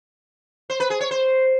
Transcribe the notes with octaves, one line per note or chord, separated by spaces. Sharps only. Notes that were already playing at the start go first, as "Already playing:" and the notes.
C5
B4
G#4
C#5
C5